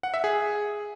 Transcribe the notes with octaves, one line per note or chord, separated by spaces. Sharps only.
F#5
E5
G#4